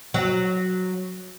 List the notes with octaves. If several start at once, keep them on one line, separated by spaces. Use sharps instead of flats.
F#3